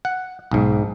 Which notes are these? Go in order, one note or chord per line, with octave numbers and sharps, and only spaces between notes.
F#5
B1 G#2